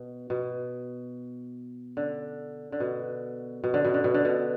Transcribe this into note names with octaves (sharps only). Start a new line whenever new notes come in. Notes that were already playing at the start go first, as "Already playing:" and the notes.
Already playing: B2
B2
D3
D3
B2
B2
D3
B2
D3
B2
D3
B2